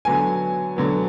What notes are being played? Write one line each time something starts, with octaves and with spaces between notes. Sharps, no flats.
D3 F#3 B3 G#5
D3 F#3 B3